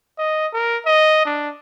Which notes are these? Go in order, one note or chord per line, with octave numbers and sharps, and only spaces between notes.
D#5
A#4
D#5
D4